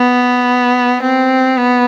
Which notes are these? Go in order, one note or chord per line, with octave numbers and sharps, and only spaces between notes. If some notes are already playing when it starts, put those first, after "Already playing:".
Already playing: B3
C4
B3